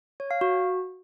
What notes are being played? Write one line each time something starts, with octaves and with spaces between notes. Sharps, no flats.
C#5
F5
F#4